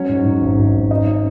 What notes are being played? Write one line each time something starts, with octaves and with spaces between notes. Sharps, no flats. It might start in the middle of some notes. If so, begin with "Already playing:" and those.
Already playing: F#3 C#4 C#5
G#2
G#2
G#1
G#1
G#1
C#4 D#4 D#5
C#4